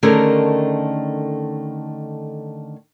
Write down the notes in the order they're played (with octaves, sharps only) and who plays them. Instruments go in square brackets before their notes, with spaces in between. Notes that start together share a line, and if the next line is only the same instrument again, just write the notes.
[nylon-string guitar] D3 D#3 A3 C#4 G#4 A#4